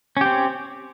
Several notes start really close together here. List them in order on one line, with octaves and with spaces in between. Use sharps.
C#4 G4 C4